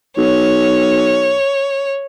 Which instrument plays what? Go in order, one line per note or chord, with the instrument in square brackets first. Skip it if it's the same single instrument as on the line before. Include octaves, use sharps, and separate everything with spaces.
[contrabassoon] B1 [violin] C#5